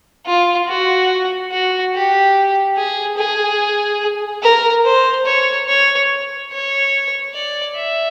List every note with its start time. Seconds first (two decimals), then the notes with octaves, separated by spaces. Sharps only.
0.26 F4
0.68 F#4
1.52 F#4
1.94 G4
2.77 G#4
3.18 G#4
4.42 A#4
4.85 C5
5.26 C#5
5.68 C#5
6.52 C#5
7.34 D5
7.76 E5